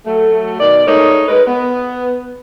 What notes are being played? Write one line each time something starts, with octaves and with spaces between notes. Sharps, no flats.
F#3 A3
B2 D#3 D5
G#3 A3 D#4 A#4 C#5
G#3 D#4 A#4 B4
B3